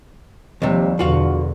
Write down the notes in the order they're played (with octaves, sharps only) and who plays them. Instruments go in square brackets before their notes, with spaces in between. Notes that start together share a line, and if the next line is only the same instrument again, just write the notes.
[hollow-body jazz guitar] D#2 C3 [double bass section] F3 G3
[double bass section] E2 B2 D3 [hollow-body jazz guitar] F4 F#4 F5